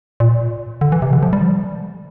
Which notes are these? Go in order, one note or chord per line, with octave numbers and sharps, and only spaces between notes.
A#2
D3
E3
C3
D3
F3
G3